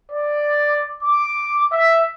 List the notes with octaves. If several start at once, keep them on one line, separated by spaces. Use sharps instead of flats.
D5
D6
E5